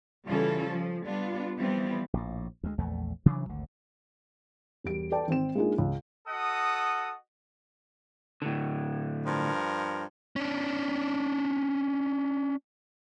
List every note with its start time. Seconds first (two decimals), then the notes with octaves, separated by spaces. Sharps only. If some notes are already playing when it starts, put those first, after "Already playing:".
0.25 C#3 E3 G3 C#4 F4 A4
0.69 F3
1.06 G3 B3 D4 F4
1.57 E3 F3 G3 B3 C4
2.13 A#1 A2
2.63 D2 G#3
2.78 A#1 E2 A3
3.26 C3 E3 F#3 D4
3.49 G#1 D2 D3
4.84 E1 G3 D7
5.11 A4 B4 D5 G5 A5
5.28 G#1 C4 C5 E7
5.55 G#3 A#3 D4 D#4 F4 G#4
5.78 C#2
6.28 F#4 A4 D#5 F#5 D#6
8.42 A2 D3
9.26 G2 F3 A#4
10.36 C#4 D4